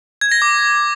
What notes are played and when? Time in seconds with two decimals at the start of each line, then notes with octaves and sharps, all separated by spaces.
0.21 G#6
0.32 A#6
0.42 D6